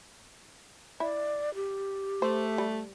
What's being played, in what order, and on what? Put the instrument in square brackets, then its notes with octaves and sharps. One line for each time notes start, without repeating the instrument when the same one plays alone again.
[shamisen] E4 [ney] D5
[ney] G4
[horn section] A3 [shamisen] C5
[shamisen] G3